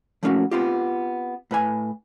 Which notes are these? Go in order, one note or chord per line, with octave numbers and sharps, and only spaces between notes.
F3 A3 A#3 C#4 F4 F#4
B3 C4 F4 G4
A2 B4 G#5